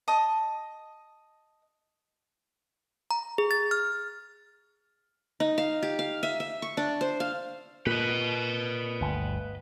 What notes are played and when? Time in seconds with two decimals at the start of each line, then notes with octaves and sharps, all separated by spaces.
0.08 D#5 A5 D#6
3.11 A#5
3.38 G#4
3.51 A6
3.71 F6
5.40 D#4
5.58 F5
5.83 G4
5.99 F5
6.23 E5
6.40 E5
6.62 C#6
6.77 D4
7.01 C5
7.20 F5
7.87 A#2 B4 D#5
9.01 G1 D2